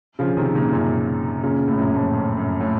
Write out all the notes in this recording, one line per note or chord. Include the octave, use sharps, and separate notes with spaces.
C#3 F3
C#3
C3 D#3
A#2 C#3
F#2 A#2
A#2 C#3
A2
F#2 A#2
F2 A2
F2
F#2
A2